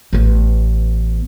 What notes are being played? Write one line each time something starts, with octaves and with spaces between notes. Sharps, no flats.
A1 B3